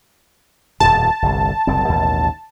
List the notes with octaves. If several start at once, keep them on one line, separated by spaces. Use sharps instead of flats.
D#1 F2 B2 A5
G1 C2
F#1 C2 C4
A1 D#2 B2